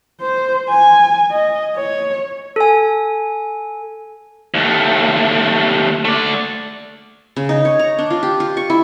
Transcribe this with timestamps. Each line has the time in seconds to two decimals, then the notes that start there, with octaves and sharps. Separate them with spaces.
0.20 C5
0.70 G#5
1.30 D#5
1.76 C#5
2.56 A4 G#5
4.54 D#2 A3
6.05 A3 D5
7.36 C#3
7.49 D#4
7.65 C#5
7.79 A#5
7.98 D4
8.10 F4
8.23 G4
8.40 F4
8.57 C#6
8.70 E4